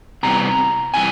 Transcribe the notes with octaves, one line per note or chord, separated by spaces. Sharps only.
C3 E3 G3 B3 A#5
C3 E3 G3 G#5